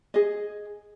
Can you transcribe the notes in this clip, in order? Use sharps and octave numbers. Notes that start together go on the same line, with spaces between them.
G#4 D#5